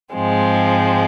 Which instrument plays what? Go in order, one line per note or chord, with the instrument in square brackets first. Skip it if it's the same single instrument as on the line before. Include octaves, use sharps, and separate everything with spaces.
[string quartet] G#2 F3 G#3 C4